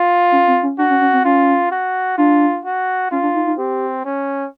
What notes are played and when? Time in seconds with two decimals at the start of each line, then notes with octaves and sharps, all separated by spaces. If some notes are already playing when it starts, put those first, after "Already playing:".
Already playing: F4
0.32 C#4
0.48 C4
0.63 C#4
0.78 D4 F#4
0.90 C#4
1.01 C#4
1.13 C4
1.25 C#4 F4
1.71 F#4
2.18 D4 F4
2.64 F#4
3.11 C#4 F4
3.23 D4
3.35 D#4
3.46 D#4
3.58 C4 G4
4.05 C#4